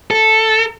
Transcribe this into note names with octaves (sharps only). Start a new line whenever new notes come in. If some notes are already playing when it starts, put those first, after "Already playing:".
A4